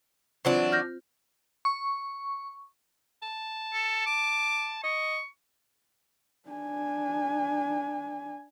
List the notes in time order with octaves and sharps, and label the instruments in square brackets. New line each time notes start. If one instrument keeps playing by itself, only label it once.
[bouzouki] E3 F#3 D4 [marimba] C4 F4 C5
[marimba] F6 G6 A#6
[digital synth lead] C#6
[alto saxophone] A5
[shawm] A4
D6
[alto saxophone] D#5 [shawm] C#6
[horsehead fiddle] D4 G#5